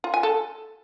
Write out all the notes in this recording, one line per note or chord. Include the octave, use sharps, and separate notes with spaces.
F4
G#5
A4